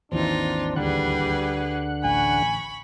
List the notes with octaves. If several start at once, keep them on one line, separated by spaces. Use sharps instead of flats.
G#1 D#2 E3 C4 D4 D#4 F4
D2 D3 G3 G4 G#4 B4 F#5
A1 G#5 B5 C#6